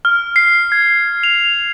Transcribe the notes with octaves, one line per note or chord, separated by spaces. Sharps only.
F6
C7
G#6
F7